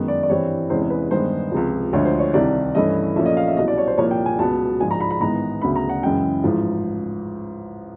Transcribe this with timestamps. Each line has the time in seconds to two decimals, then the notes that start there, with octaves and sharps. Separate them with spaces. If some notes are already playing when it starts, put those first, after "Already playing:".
Already playing: F#2 D#3 G#3 B3
0.08 D5
0.23 D5
0.29 G2 E3 G3 C4 C#5
0.70 E2 C3 E3 G#3 C#4 C5
0.90 B4
1.11 G2 D#3 G#3 B3 C5
1.52 C#2 C3 F3
1.93 D2 D3 F3 G#3 C#5
2.05 C5
2.19 C#5
2.34 C2 C3 D#3 G3 D5
2.75 G2 E3 A3 C#4 D#5
3.16 A#1 A#2 F3 A3 C#4 E5
3.26 D#5
3.37 F5
3.47 E5
3.57 C2 B2 F#3 D#5
3.68 D5
3.78 C#5
3.88 C5
3.98 C2 A#2 F3 A#3 C#5
4.11 G5
4.26 G#5
4.39 C#2 B2 F#3 B3 A5
4.80 A#1 G#2 F3 G#3 G#5
4.91 A#5
5.00 B5
5.11 B5
5.20 A1 G#2 D#3 G#3 B3 A#5
5.61 D2 C#3 F#3 B3 B5
5.76 A#5
5.89 F#5
6.03 F#2 C#3 E3 G#3 G5
6.44 A1 G#2 F3